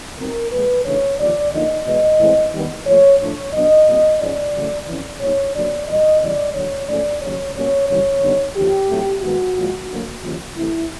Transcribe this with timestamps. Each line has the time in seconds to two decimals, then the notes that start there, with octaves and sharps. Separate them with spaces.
0.18 B2 G3 C4 D#4 A#4
0.52 A#2 F3 G#3 B4
0.85 C#3 E3 A3 D4 C#5
1.19 D#2 D3 F3 D5
1.52 D3 F3 A#3 D#4 D#5
1.86 E2 B2 G#3 B3 D#5
2.19 A2 E3 G#3 C4
2.53 D#2 D#3 G3 B3
2.86 A#2 F3 A3 C#5
3.19 A2 F3 A3 D4 C#5
3.53 B2 F#3 B3 D4 D#5
3.87 A#2 G3 C4
4.20 G#2 F3 G#3 C#4 D5
4.54 F#2 C#3 E3 A3
4.87 F2 C#3 E3
5.20 A#2 G3 B3 D#4 C#5
5.55 D3 F#3 A#3 D4 D5
5.88 E2 B2 G3 D#5
6.21 E2 C#3 E3 G3 D5
6.54 D#2 D3 F#3 C#5
6.88 G#2 F3 A3 C#4 D5
7.22 D#2 C#3 F#3 C#5
7.55 B2 G3 A#3 C#4 C#5
7.88 F#2 C#3 E3 G3 C#5
8.22 D3 G3 B3 D#4
8.56 D#2 D3 F3 G4
8.89 A2 F#3 A3 C4
9.22 G#2 D#3 G#3 B3 F#4
9.57 A#2 F3 G#3
9.90 D2 D3 F#3 A#3
10.23 D#2 C#3 F3
10.56 C3 E3 A3 E4